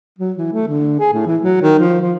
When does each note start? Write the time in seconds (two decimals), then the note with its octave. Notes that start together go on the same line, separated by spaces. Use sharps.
0.18 F#3
0.37 E3
0.53 A3
0.67 D3
0.99 G#4
1.12 A2
1.26 E3
1.42 F#3
1.61 D#3
1.79 F3
2.01 F3